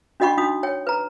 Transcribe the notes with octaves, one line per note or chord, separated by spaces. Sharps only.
D4 F#4 D#5 F#5 B5 C#6
D4 D#4 F#4 D#6
C#5 G5
B4 A#5